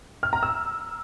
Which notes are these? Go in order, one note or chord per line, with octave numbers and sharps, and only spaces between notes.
F6
A#5
E6